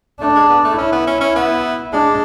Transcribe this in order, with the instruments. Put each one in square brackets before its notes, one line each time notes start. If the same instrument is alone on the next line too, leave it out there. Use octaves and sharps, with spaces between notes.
[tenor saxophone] A3 [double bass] D4
[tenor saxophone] G#3
B3
A3
[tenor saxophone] C#4 [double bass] E4
[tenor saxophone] B3
C#4
C#4
B3
[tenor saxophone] G#3 [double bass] D4